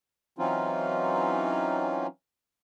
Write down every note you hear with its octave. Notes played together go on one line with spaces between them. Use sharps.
E3 F#3 C4 C#4 D#4 F4